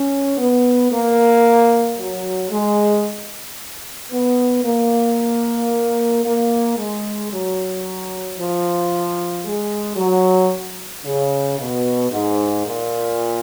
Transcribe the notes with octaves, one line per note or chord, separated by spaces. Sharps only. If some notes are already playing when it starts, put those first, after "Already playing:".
Already playing: C#4
B3
A#3
F#3
G#3
B3
A#3
A#3
G#3
F#3
F3
G#3
F#3
C#3
B2
G#2
A#2